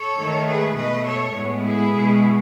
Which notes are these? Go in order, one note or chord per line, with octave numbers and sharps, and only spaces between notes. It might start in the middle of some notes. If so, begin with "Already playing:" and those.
Already playing: A4 C#5
D#3 A3
G#4 B4
B2 A3 B4 D#5
A4 C#5
A2 G#3 B3
E4 G#4
B2 G#3 B3